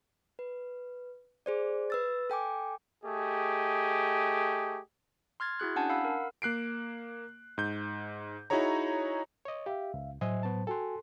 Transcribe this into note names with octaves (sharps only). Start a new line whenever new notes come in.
B4
G#4 C5 D5
B4 E6 A6
A4 G5 G#5 D6
A3 G4 G#4 D#5
C6 F6 G#6 A6
E4 F#4 G#4 F#6
C#4 D4 F#5 G#5 A5
F5 F#5 B5 E6
A#4
A#3 F#6 C7 D7
G#2 G6
D#4 E4 F#4 G#4 C#5 A#5
C#5 D#5
G4 E5 F5
C#2
A2 F#3 C5 D#5 E5 G#5
B3 A5
F#4 A4 G5 G#5 C6